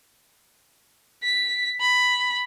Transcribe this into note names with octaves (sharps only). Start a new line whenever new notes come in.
B6
B5